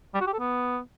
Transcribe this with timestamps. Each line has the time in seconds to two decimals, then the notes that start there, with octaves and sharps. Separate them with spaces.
0.14 G3
0.21 F#4
0.27 G4
0.33 A4
0.39 B3